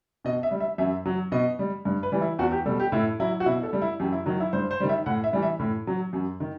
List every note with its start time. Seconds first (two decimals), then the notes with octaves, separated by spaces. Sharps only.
0.25 B2 D#5
0.43 E5
0.51 G3
0.60 E5
0.78 F#2 E5
1.06 F#3
1.32 B2 D#5
1.59 G3
1.85 G2
2.03 B4
2.12 E3 G3
2.21 E4
2.39 E2 F#4
2.52 G4
2.66 B2 G3 A4
2.80 G4
2.92 A2 E4
3.20 F#3 E4
3.40 F#4
3.46 B2 E4
3.63 A4
3.73 G3
3.82 E4
4.00 F#2 G4
4.12 E4
4.26 D#3 F#3
4.40 E4
4.53 G2 C5
4.71 C5
4.80 D#3 G3
4.89 E5
5.06 A2 F#5
5.24 E5
5.33 E3 G3
5.42 E5
5.59 A2
5.87 F#3
6.13 F#2
6.40 D#3